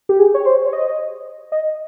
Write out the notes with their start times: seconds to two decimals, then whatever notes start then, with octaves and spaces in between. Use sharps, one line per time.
0.09 G4
0.19 G#4
0.34 C#5
0.46 C5
0.66 C#5
0.73 D#5
1.52 D#5